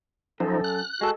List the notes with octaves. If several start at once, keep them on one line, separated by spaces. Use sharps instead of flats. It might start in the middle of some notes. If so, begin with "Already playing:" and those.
F#2 F3 D#4 A4
F#6
G#3 F#4 A4